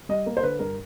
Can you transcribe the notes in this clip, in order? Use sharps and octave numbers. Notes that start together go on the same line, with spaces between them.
G3 D#5
A#3
C5
D3 B4
G2 A#4